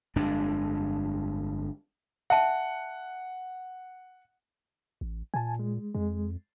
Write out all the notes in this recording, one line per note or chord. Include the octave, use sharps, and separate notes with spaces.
G1 F2 G#3 D4
E5 F#5 A5
A1
A#2 G#5 A5
G#3
F2 G#3